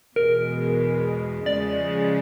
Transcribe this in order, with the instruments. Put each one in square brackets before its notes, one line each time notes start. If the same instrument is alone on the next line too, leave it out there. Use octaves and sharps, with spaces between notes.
[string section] E2 B2 G#3 [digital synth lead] A#4
[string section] C#3 F3 G#3 [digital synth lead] D5